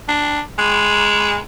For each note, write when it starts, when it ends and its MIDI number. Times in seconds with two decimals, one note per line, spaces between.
0.09 0.40 62
0.59 1.38 56